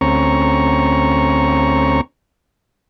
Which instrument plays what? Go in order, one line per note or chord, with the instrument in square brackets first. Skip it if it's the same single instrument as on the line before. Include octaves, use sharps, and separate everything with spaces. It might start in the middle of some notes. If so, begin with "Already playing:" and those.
[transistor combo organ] D2 C4 C#4 A#5 C#6